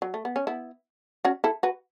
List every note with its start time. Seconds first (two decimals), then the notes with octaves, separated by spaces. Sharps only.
0.02 F#3
0.14 A3
0.25 B3
0.36 C#4
0.47 B3 E4
1.25 C#4 F#4
1.44 E4 A4
1.63 F#4 B4